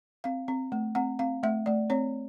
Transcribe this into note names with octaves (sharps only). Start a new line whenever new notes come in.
C4 F5
C4
A3
C4 F#5
C4 F5
A3 E5
A3 D5
C4 C#5